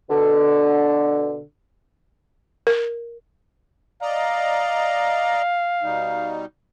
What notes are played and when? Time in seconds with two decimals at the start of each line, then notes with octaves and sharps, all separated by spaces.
0.10 B2 D3
2.67 A#4
4.02 D5 D#5 F5 A#5
5.83 B2 G3 D#4